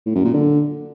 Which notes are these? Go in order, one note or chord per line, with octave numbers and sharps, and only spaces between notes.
A2
F#2
A#2
D3